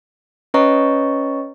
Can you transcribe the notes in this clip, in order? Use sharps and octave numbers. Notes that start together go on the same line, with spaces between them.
C#4 B4 C#5 D#5 A#5 C#6